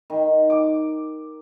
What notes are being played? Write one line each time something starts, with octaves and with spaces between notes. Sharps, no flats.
D#3
D6